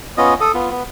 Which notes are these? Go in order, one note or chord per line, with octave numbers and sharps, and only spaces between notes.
B3 C#4 F4 D#5
A4 D#6
B3 F4
B3